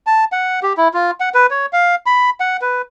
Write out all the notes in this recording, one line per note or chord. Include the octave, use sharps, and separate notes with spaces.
A5
F#5
G4
E4
F4
F#5
B4
C#5
F5
B5
F#5
B4